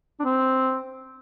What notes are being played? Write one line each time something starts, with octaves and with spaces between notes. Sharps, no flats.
D4
C4